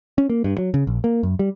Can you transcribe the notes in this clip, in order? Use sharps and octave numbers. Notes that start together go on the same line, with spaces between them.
C#4
A#3
G2
F#3
C#3
A#1
A#3
F#2
G3